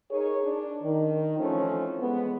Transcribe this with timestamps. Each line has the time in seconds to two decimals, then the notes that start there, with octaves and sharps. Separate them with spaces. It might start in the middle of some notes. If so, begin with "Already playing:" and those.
0.11 D#4 G#4 A#4 C#5
0.44 D4
0.83 D#3
1.38 E3 F3 A3 C4 C#4
2.00 E3 G#3 B3